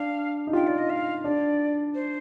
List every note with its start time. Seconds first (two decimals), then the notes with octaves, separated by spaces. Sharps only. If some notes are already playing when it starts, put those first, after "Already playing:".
Already playing: D4 F5
0.47 D#4
0.53 F4 G5
0.66 D5
0.77 D#5
0.89 F5
1.24 D4 D5
1.94 C5